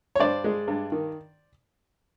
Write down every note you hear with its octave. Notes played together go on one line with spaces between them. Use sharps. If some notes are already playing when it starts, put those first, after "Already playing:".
C#5
G2 C5 D5
G#3
G2
D#3